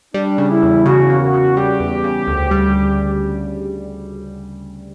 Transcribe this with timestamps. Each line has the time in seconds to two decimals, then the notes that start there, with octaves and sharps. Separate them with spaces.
0.14 G3 D4
0.38 C#3
0.50 E4
0.63 E2
0.86 C#3 F#4
1.10 A#3
1.21 F#4
1.34 C#3
1.57 G3 G4
1.80 E2
2.04 C#3
2.27 D2
2.51 G3